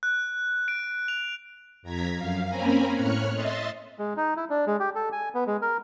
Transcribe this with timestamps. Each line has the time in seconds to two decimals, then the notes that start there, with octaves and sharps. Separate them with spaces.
0.03 F#6
0.68 D7
1.08 F7
1.82 F2 A#5 G#6 B6
2.16 F#2 F5
2.48 A#3 C4 C#4 G#5 A#5 B5
2.95 A2 C#5 F6 F#6 C#7
3.33 D#5 E5 C6 A6
3.99 G#3
4.17 D#4
4.37 E4
4.50 D4
4.67 G#3
4.80 G4
4.95 A4
5.12 G#5
5.34 B3
5.47 G#3
5.62 A#4